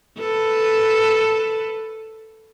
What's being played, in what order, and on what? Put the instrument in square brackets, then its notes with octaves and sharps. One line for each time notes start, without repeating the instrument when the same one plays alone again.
[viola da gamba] A4 B4